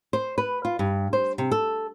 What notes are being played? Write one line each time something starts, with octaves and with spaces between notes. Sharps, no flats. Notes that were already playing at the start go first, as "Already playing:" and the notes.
C5
B4
F4
G2
C5
C3
A4